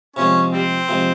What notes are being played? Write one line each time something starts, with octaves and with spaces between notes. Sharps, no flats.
C3 F3 G#3 C#4
G3 C4
C3 F3 G#3